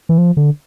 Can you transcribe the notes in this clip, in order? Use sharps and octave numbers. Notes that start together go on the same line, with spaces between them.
E3
F3
D3